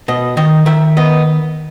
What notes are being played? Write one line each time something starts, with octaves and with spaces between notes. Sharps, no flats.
B2 D#5
D#3 D#5
D#3 E5
B3 D#5